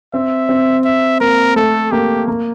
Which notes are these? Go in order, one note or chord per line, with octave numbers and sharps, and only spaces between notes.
C4 E5
C4
E5
A#3 A#4
A3 A4
A#3 G4
A#3